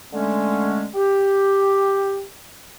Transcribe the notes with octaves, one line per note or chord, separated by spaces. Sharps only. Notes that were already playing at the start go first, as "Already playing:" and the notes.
D3 G#3 A3 C#4
G4